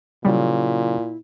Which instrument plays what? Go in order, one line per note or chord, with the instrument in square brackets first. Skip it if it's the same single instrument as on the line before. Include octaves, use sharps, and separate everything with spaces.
[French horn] A#2 [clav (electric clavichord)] C#3 F#3 [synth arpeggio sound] G3 [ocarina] E4